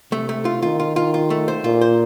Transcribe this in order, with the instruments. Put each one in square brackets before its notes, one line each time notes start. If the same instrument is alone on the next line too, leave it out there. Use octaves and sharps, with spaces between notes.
[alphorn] C3 [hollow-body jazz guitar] A3
[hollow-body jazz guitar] A3
F4
[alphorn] D#3 [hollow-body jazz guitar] F4
[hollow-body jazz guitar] F4
F4
F4
A3
C5
[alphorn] A#2 [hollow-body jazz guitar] F4
[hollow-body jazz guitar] C5